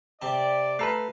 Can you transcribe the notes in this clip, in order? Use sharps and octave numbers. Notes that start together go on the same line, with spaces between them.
C3 G4 D5
A3 A4 B4 F5 A#5 C7